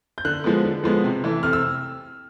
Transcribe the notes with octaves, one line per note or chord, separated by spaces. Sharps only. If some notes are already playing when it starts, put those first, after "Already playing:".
G6
D3 F#6
F3 G#3 B3
D3
F3 G#3 B3
C3
E3 A3
C3 F6
E6